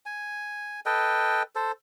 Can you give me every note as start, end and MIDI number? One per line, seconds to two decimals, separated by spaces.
0.06 0.80 80
0.86 1.43 69
0.86 1.43 71
0.86 1.43 75
0.86 1.43 79
1.55 1.72 69
1.55 1.72 72